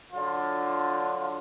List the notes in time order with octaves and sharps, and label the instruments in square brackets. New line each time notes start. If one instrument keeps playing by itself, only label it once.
[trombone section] D3 F#3 D4 F4